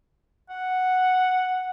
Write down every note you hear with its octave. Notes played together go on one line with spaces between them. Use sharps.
F#5